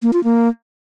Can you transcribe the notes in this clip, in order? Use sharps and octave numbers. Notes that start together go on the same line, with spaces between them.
A#3
F4
A#3